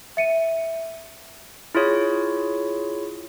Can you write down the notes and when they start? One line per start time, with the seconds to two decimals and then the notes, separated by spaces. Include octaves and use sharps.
0.17 E5 C#7 D#7
1.75 E4 F4 G#4 C#5